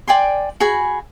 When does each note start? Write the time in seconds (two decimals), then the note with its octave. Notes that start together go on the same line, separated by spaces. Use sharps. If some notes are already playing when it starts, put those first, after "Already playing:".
0.08 D5 G5 G#5 C6
0.60 F#4 G#4 G#5 B5